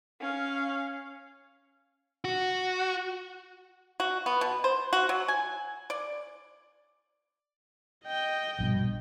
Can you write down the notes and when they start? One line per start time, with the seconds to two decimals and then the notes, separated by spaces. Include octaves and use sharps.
0.21 C#4 F5
2.25 F#4
4.00 F#4
4.26 B3
4.41 B2
4.64 C5
4.93 F#4
5.09 F#3
5.28 G#5
5.90 D5
8.06 D#5 G5
8.59 A#1 G2 B2